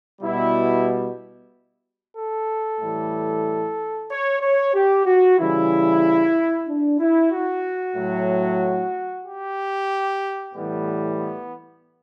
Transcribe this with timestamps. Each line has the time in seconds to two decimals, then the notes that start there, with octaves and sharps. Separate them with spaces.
0.22 B2 G3 E4
2.16 A4
2.80 A2 E3 G3
4.10 C#5
4.41 C#5
4.74 G4
5.05 F#4
5.39 C#3 E3 G3 E4
6.68 D4
7.00 E4
7.32 F#4
7.96 A2 F#3
9.25 G4
10.54 A2 E3 G3 B3
11.18 B3